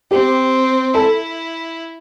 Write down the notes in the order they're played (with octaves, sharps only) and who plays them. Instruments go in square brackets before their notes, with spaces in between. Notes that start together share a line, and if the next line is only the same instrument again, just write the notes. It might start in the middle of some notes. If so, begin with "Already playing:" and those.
[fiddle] C4 [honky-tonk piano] G4
[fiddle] E4 [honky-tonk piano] A4